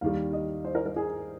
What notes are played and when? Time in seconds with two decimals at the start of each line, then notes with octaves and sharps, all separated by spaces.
0.01 D#2 D#3 G3 F5
0.33 D#5
0.65 C5
0.75 A#4
0.86 A#4
0.96 G#4